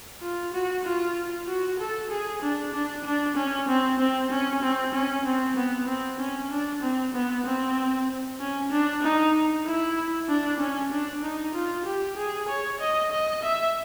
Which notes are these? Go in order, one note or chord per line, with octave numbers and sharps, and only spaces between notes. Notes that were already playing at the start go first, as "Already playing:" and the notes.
F4
F#4
F4
F#4
A4
G#4
D4
D4
D4
C#4
C4
C4
C#4
C4
C#4
C4
B3
C4
C#4
D4
C4
B3
C4
C#4
D4
D#4
E4
D4
C#4
D4
D#4
F4
G4
G#4
C#5
D#5
D#5
E5